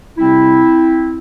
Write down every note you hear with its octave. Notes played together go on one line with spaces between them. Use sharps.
C3 G3 C4 E4